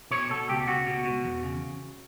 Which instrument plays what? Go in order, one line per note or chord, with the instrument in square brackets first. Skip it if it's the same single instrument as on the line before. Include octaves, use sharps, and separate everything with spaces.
[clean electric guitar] B2 C#5
B2 A4
C#2 G4
C#2 F#4
B2
B2
E2
C#3